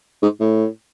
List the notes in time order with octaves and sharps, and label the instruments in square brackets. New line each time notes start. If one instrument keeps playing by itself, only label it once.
[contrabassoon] G#2
A2